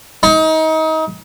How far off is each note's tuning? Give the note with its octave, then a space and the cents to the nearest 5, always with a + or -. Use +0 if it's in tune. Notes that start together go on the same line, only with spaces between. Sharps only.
D#4 +30